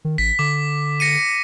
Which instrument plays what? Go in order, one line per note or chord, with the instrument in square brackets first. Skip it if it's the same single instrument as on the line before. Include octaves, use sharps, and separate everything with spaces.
[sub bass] D#3
[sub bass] A1 [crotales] B6
[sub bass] D3 [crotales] D6
[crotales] A#6 C#7 D#7